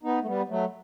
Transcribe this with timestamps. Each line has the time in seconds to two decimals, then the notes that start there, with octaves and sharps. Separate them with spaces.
0.03 B3 D#4
0.22 A3
0.26 G3 B3
0.49 F#3 A3